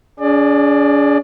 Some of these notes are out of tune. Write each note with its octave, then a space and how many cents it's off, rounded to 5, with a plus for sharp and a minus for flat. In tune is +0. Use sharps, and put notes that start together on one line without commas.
D4 -45 G#4 +0 D5 +25